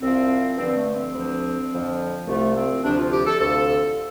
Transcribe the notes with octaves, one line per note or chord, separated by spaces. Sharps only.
C2 C3 F3 C4
G2 D3 F3 C4
C4
A3
C4
D2 D3 F3
F2 D3 F3
C2 C3 F3 A3
C4
D2 C3 F3 D4
F4
G4
A4
D2 C3 F3 A4